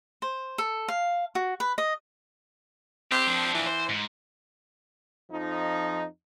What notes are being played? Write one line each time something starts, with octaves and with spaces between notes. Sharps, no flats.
C5
A4
F5
F#4
B4
D#5
C4 G4
F3 D4
E3
C5
G#2
F2 F3 D#4